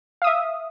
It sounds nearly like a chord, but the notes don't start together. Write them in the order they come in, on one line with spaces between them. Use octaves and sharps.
F5 D#6 E5